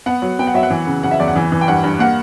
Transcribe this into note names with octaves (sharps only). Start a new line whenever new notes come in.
B3 F#5
F#3
B3 G5
F#5
F#3 E5
F#5
E3
C#3
C#3 F#5
E5
E2 D5
F#5
E3
E3
G5
G2 F#5
G2
A#3 F#5